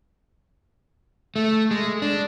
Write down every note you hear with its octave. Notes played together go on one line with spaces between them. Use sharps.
A3
G#3
D4